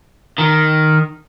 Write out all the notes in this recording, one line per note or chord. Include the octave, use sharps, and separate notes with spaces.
D#3